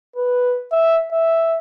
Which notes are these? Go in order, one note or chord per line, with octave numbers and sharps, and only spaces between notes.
B4
E5
E5